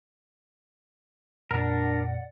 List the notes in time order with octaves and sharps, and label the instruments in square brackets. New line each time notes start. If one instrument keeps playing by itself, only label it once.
[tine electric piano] F2 A#2 [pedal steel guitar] D4 A#4 [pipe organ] D5 F#5